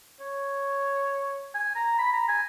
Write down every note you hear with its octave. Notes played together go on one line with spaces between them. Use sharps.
C#5
G#5
A#5
B5
A#5
G#5